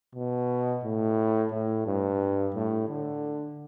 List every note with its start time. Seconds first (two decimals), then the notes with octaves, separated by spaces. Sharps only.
0.15 B2
0.84 A2
1.52 A2
1.86 G2
2.55 A2
2.89 D3